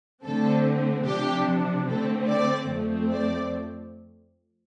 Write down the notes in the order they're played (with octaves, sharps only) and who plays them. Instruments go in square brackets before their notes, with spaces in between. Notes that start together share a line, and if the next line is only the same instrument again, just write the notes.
[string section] D3 A3 C4 A4
C3 F3 D4 G4
D3 A3 C4 A4
D5
F2 F3 A3 C4
D5